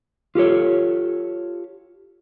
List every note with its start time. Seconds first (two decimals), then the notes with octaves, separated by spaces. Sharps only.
0.35 F4 G4 A4 C#5